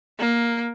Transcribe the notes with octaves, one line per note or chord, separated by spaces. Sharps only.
A#3